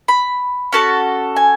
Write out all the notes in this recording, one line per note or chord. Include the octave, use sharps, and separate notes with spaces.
B5
C#4 F#4 A4 A5
G#5